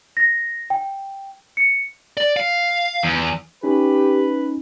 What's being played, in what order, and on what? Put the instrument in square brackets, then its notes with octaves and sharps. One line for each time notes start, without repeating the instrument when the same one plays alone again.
[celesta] A#6
G5
C#7
[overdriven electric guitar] D5
F5
E2
[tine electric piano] C#4 D#4 [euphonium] G4 [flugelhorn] B4